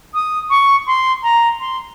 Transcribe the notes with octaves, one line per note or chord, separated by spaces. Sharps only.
D#6
C#6
C6
A#5
C6